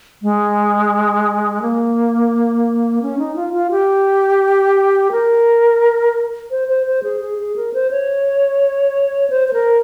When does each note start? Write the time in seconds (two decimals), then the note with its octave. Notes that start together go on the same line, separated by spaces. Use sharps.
0.22 G#3
1.62 A#3
3.02 C#4
3.19 D#4
3.36 F4
3.53 F4
3.71 G4
5.11 A#4
6.51 C5
6.68 C5
6.87 C5
7.03 G#4
7.20 G#4
7.38 G#4
7.56 A#4
7.74 C5
7.91 C#5
9.30 C5
9.48 C5
9.53 A#4